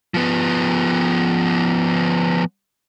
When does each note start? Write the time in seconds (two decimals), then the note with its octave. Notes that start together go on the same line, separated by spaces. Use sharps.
0.14 F3 B3